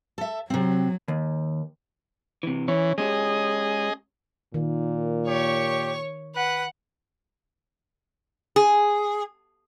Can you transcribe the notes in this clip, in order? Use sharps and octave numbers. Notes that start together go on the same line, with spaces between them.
A4 E5
C3 F#3 C4
D#2
C3 E3
E3 C#4 C#5
G#3 C#4 G4 G#4 D#5
A#2 D#3
G4 C#5 C#6
B4 F#5
G#4